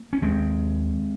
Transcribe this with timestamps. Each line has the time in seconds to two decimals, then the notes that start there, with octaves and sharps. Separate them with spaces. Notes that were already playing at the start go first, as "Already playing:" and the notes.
Already playing: A#3
0.13 C#4
0.22 D#2 G#3 C4